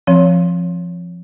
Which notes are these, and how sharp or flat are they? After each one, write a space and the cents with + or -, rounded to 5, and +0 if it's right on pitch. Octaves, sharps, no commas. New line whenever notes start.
F3 +0 C4 +25 C#5 +20